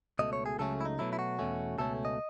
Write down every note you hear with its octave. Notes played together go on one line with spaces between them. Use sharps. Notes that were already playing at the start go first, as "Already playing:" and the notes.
C#2 B2 A3 D#5
C#5
G#4
C#2 C#3 F#3 A3 C#4 A4
E4
D#4
B2 F#3 A3 E4
E4
F#4
E2 B2 A3 C#4
C#2 B2 A3 C#4 A4
D#5